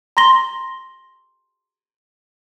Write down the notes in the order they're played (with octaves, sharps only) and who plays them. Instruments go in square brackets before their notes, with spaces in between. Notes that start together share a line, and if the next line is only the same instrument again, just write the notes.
[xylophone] A#5 C6 A#6 G7